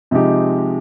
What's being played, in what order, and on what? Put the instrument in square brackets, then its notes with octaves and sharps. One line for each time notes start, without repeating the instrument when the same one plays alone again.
[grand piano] C3 F3 G#3 D#4 G4